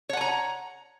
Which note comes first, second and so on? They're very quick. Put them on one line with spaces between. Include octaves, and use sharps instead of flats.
C#5 F#5 G#5 A#5